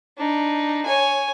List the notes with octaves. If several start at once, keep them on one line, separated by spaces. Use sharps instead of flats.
D4 D#4
C#5 G#5